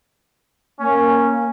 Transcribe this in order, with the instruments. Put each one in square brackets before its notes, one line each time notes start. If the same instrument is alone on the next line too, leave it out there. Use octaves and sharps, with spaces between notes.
[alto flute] A#3 [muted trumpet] C#4